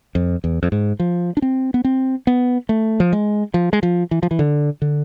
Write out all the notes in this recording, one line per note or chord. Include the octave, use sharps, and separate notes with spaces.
F2
E2
F2
G#2
F3
D4
C4
B3
C4
B3
A3
F3
G#3
F3
G#3
F3
E3
F3
E3
D3
D3